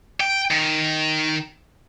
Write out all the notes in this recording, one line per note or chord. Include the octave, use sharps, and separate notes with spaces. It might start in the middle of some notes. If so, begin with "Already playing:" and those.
G5
D#3